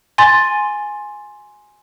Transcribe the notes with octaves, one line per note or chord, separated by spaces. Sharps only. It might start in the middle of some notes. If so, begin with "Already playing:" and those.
G#5 C6 A6